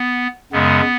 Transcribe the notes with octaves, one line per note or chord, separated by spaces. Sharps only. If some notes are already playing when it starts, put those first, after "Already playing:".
Already playing: B3
F#2 C#3 G#3 B3